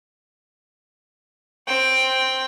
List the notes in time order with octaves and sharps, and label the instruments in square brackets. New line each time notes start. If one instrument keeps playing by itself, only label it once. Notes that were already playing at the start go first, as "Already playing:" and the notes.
[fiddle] C4 G5